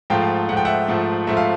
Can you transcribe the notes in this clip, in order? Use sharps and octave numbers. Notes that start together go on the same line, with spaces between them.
G#2 F3 A3 F5 G5
G#2 F3 A3 F#5
G5
E5 F#5
G#2 F3 A3
G#2 F3 A3 E5
F5